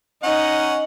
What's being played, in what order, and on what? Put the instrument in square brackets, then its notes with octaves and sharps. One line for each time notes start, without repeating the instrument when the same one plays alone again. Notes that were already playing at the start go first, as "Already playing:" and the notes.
[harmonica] C#4 D#5 F#5 [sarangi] D#4